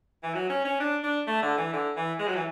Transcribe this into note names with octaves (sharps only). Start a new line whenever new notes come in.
E3
F#3
C#4
C#4
D4
D4
A3
D3
E3
D3
E3
G#3
F#3
E3